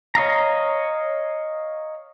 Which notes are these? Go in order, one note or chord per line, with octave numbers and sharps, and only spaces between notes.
C#5 D#5 F5 A#5